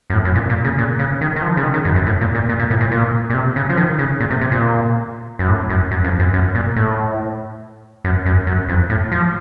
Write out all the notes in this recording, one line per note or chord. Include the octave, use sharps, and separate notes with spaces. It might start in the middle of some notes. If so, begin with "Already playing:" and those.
F#2
A2
F#2
A#2
A#2
C#3
A#2
C#3
D#3
D#3
F3
C#3
D#3
D#3
F#2
F#2
A2
A#2
A#2
A#2
A#2
A2
A#2
A#2
A#2
C3
C#3
F3
D#3
C#3
A#2
C3
C3
A#2
F#2
A2
F#2
F#2
F2
F#2
F#2
A#2
A2
F#2
F#2
F#2
F2
A2
F3